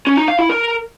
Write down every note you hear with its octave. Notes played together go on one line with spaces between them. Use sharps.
C#4
D#4
F5
E4
A#4